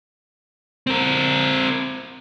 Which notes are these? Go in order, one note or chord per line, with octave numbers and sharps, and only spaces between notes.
C4 A#4